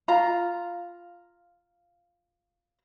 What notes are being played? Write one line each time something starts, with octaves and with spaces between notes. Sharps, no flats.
F4 A#5